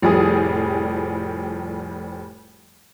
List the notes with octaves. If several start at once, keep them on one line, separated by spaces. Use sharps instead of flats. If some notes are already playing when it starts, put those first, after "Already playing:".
F1 A2 F3 G3 G#4 D#6